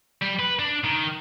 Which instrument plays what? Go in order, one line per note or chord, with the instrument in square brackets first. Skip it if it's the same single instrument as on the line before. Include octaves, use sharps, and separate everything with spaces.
[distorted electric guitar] G3
B4
D4
D#3